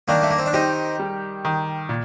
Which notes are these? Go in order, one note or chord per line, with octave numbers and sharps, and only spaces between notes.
D#3 A#3 D4
A3
A#3
C4
D4
C4 D#4 G4
G3
D#3
A#2